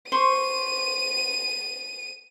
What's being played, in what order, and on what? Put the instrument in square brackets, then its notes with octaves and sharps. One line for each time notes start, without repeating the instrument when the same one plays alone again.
[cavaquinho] C5 C6 C#6 [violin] D#7